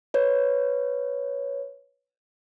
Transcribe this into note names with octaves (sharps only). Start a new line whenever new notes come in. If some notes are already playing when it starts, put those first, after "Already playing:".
B4 C#5